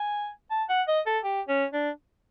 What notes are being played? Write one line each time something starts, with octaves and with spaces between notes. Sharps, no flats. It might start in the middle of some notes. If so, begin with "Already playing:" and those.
Already playing: G#5
A5
F#5
D#5
A4
G4
C#4
D4